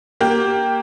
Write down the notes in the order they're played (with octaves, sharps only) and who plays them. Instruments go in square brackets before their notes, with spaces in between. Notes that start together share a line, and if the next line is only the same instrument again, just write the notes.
[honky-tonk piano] A#3 G4